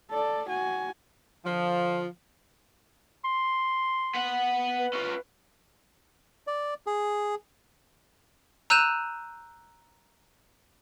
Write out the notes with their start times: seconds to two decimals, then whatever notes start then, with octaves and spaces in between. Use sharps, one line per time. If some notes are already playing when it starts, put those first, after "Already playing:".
0.11 A4 D5
0.48 F#4 G#5
1.45 D3 F3
3.24 C6
4.14 B3 F#5
4.79 B4
4.93 C#4 F4
6.47 D5
6.86 G#4
8.70 A#5 E6 F#6 G6 D#7 E7